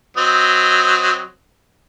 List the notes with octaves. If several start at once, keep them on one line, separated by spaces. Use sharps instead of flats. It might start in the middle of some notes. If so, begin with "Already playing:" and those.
F#3 C4 D#5